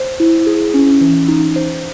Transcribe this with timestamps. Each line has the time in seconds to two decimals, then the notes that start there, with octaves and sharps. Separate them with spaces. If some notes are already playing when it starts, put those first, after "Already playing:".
Already playing: C5
0.20 E4
0.47 G#4
0.74 C#4
1.01 E3
1.28 D#4
1.56 C5